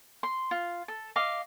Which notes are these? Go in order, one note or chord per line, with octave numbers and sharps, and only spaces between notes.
C6
F4
A4
D#5 F5 D6